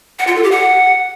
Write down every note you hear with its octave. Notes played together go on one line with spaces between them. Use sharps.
F#5
F4
A4
G4
F#5